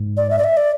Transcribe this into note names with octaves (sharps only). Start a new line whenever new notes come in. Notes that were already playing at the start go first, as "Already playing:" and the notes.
Already playing: G#2
D5
E5
D5
E5
D5